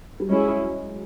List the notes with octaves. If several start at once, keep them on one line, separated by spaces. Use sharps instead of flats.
G3
F#3 G#3 C#4 E4 G#4